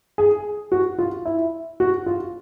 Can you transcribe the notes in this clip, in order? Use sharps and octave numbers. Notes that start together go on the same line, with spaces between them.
G#4
F#4
F4
E4
F#4
F4